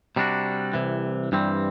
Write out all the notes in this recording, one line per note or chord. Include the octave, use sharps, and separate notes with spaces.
C3 G3 D4 F#4
C2 C3 E3
G2 E3 G3 C4